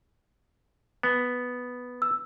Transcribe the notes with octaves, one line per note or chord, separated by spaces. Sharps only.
B3
E6